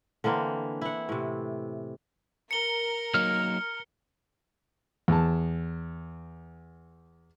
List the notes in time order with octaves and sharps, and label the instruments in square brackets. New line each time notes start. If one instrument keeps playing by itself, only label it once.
[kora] D3 E3 A#3 C4
E4 F#5
A2 C3
[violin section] A#4 [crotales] C#7 G7
[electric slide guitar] F#3 A#3 D#4 [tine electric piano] F6
[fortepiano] E2 A5